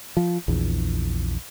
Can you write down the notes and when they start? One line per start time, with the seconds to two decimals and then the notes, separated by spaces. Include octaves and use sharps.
0.17 F3
0.48 A#1 E2